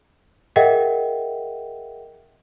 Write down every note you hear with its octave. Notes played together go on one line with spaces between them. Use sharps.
G#4 A#4 D#5 E5 F#5 G5